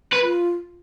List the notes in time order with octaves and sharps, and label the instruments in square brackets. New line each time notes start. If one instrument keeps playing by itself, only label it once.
[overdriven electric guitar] B4
[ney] F4